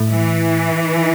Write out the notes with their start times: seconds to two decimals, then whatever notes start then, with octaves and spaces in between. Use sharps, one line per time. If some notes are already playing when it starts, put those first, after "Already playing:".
Already playing: A2
0.09 E3